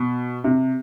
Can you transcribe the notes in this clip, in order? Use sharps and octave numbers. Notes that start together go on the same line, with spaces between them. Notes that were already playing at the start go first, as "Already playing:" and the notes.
Already playing: B2
C3